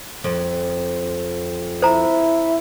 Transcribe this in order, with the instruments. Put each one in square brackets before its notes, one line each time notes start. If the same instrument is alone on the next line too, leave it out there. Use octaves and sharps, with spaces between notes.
[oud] F2
[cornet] E4 [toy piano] C5 A#5